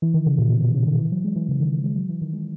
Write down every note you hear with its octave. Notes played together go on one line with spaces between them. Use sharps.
E3
D#3
C#3
A#2
B2
B2
C#3
D#3
E3
F#3
G#3
E3
C#3
D#3
E3
G#3
F#3
E3
D#3
G#3